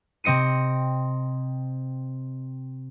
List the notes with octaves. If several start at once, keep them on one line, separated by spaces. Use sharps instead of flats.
C3 C4 D#5 C#7 D#7